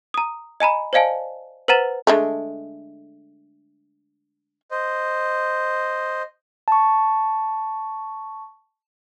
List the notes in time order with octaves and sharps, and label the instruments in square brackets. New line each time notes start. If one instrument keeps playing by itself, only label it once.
[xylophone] A#5 D#6
D#5 G#5 A#5 B5
C5 D5 D#5 F5 G#5 A5
B4 C5 F#5 A#5 A6 E7
[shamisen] D3 G#3 A3
[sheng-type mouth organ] C5 D#5
[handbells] A5 C#6